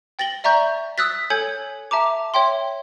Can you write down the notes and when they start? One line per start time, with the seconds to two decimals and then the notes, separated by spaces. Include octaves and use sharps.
0.19 G5 A6 A#6 F#7 G7
0.44 D5 E5 A#5 C#6 G6
0.98 D#6 E6 F#6 A6 B6
1.30 A4 C#5 G#5 G6 G#6 C#7
1.91 E5 A5 A#5 D6
2.34 C#5 E5 G5 C6